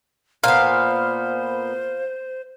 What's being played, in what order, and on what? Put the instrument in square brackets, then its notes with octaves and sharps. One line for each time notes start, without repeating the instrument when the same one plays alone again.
[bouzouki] A#2 B3 [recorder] C5 [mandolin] F5